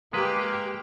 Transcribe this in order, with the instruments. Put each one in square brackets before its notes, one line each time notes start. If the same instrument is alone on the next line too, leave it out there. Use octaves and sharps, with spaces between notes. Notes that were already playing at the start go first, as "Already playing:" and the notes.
[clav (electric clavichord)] G#3 B4 [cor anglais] A#3 [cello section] G4